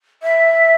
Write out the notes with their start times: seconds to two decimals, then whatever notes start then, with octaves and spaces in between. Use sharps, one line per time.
0.23 E5